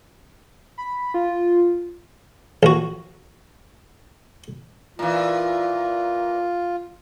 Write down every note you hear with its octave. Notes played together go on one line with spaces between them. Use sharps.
B5
F4
A#1 F#4
A#2 E3 F4